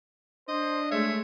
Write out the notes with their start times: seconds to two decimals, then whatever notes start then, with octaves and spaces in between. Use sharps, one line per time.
0.48 D4 C5 D#5
0.91 G#3 A3 C#5 E5